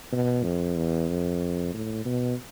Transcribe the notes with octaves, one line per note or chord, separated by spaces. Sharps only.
B2
F2
E2
F2
A2
B2